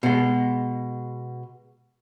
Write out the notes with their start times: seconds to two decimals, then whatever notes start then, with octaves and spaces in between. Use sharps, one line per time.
0.03 B2 G#3